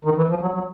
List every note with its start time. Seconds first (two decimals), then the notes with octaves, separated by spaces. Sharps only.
0.05 D#3
0.17 E3
0.30 F3
0.41 F#3
0.54 F#3